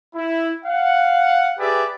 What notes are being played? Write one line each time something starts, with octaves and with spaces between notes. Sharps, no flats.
E4
F5 F#5
G4 G#4 B4 D5 E5